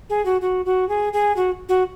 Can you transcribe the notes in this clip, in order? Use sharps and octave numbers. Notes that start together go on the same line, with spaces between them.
G#4
F#4
F#4
F#4
G#4
G#4
F#4
F#4